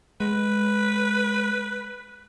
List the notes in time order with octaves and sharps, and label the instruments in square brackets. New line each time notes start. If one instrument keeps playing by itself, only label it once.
[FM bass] G#3 [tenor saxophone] B4